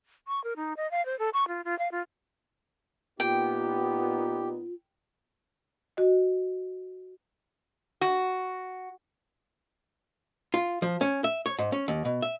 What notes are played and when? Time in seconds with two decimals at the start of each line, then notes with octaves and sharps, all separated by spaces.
0.28 C#6
0.44 A#4
0.56 D#4
0.77 D#5
0.91 F5
1.05 C5
1.19 A4
1.34 C#6
1.48 F4
1.64 F4
1.79 F5
1.91 F4
3.20 A#2 B3 D#4 F4 G4 G5
5.97 F#4 D#5
8.01 F#4
10.54 F4
10.82 F3
11.01 C#4
11.24 E5
11.46 C#5
11.59 G#2
11.72 C#4
11.88 D#2
12.05 B2
12.22 E5